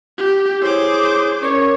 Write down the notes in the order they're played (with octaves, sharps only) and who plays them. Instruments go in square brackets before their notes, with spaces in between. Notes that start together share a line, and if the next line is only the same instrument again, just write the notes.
[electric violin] G4
[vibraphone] E4 C#5 [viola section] G#4 [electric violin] C5 D6
[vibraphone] C#4 A#4 D6 [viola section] C#5